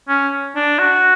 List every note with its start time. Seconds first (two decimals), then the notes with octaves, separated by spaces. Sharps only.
0.08 C#4
0.56 D4
0.79 F#4